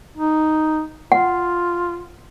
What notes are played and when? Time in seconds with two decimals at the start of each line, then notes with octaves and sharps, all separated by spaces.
0.17 D#4
1.12 F4 F#5